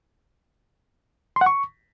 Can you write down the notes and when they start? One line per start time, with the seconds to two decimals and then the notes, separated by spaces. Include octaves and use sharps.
1.36 C6
1.41 F#5
1.46 C#6